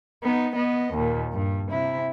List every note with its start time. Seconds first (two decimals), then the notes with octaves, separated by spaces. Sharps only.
0.23 B3 D#4
0.55 B3 D#5
0.94 D#2 A#2
1.33 G2
1.71 C3 E4